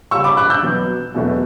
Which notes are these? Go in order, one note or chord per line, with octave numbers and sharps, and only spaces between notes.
C#3 G3 C#4 C#6 E6
B5 D6
D6 F#6
E6 G6
B2 F#3 B3
E2 B2 F#3 A3